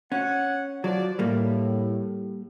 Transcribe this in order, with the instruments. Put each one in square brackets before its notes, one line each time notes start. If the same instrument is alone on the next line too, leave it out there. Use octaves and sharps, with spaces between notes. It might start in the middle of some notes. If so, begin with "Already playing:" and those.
[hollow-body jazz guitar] C#4 [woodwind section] F#5
[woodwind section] F3 D5 [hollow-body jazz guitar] F#3
[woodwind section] A2 [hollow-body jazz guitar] G3 A#3